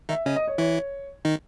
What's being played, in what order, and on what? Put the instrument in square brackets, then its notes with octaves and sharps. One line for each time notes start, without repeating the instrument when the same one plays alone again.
[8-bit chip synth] D#3 D#4 [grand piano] E5
[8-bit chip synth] C#3 C#4 [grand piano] D#5
[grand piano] D#5
C#5
[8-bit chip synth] E3 E4 [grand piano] C#5
[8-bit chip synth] D#3 D#4